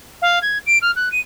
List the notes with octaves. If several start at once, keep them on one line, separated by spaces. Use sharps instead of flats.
F5
G#6
D7
F6
F#6
D#7